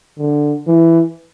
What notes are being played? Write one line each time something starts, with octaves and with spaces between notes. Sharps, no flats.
D3
E3